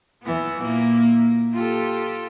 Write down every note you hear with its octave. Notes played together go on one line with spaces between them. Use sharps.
E2 E3 B3
A#2 A#3 E4
F4 G4 A4